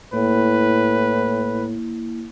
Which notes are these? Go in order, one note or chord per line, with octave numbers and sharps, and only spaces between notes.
A2 A#3 E4 B4